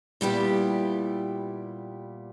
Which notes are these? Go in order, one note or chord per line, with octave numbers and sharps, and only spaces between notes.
A#2 G3 B3 E4 G4